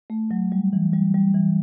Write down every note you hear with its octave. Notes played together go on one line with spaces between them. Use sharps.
A3
F#3
G3
E3
G3
G3
E3